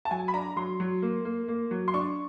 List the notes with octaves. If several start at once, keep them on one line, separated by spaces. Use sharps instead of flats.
A5
F#3 G#5
B5
D4 A#5
F#3 C6
F#3
A#3
A#3
A#3
F#3
C6
D4 C#6